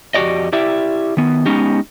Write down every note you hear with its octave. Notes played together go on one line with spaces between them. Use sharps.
F2 F#4 G4 D5 D#5
E4 G4 D5 E5
D#3 B3
G#3 B3 C#4 D#4 G4